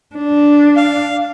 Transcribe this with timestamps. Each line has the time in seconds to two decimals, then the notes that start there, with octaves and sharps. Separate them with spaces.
0.16 D4
0.77 F5